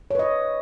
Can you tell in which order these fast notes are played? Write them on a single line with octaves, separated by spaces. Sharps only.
C#5 B4 D#5